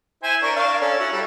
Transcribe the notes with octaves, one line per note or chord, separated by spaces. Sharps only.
E4 C5 G#5
D4 A#4 C#6
D4 F5
C#4 A4
C#4 E4 F#4
G3 A4